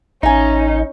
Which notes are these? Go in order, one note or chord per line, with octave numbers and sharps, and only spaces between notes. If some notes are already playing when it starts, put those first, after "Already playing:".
A1 C#4 D#4 E5 G#5